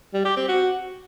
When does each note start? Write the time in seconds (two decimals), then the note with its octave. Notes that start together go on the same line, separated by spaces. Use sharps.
0.14 G3
0.25 G4
0.37 C4
0.48 F#4